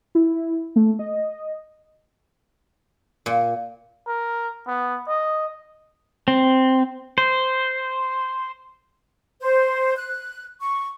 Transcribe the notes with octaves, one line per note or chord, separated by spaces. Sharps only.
E4
A3
D#5
A#2
A#4
B3
D#5
C4
C5
C5
F#6
C#6